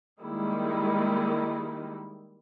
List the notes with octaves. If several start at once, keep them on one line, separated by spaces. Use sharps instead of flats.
D#3 G3 G#3 A#3 D#4 E4